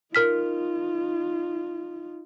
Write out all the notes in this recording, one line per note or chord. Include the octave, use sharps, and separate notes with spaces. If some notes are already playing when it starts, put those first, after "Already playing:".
D#4 F4 A#4 F6 B6